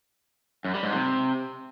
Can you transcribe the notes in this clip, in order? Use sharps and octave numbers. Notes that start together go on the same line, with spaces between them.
F#2
G3
G#2
C3